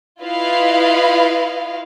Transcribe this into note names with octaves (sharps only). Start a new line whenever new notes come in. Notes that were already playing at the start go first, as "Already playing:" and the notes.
E4 F4 B4 D#5 F5